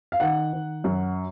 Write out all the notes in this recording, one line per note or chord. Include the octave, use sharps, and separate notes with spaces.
F5
D#3 F#5
D#3
F#2